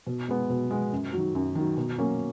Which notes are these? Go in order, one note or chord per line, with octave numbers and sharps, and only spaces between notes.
B2
G#3 B3
B2
G#3 B3
F#2
D#3 F#3
F#2
D#3 F#3
B2
F#3 A#3 C#4